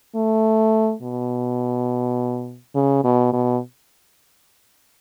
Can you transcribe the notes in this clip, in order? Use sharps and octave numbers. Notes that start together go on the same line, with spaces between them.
A3
B2
C#3
B2
B2